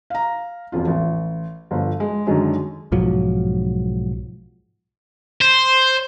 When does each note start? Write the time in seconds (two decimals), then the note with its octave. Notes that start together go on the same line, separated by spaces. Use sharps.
0.10 F5 A#5
0.72 E1 F2 F4
0.87 A1
1.71 G1 F3
2.00 G#3
2.27 F#2 D3 D#3 F#3 G#3
2.92 B1 G#2 F3 F#3
5.42 C5